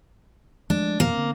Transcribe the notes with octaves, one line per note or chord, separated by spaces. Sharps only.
F3 G#3 A3 D4
F#2 B2 F3 A#3
D3 C4